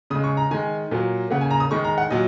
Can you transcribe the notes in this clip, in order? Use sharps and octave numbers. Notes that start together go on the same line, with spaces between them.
C#3 G#3 D#6
C#6
A#5
D#3 G#3 G#5
A#2 F#3 A#3
C#3 A#3 F#5
G#5
A#5
D#6
D#3 G#3 C#6
A#5
F#5
A#2 F#3 D#5